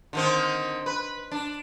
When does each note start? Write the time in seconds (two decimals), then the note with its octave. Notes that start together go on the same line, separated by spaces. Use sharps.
0.13 D3 D#3 C4
0.86 B4
1.31 D4